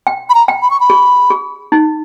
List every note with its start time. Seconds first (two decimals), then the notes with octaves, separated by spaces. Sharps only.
0.07 G5
0.30 B5
0.35 A#5
0.48 G5
0.62 B5
0.71 C#6
0.80 B5
0.90 G#4
1.30 G#4
1.72 D#4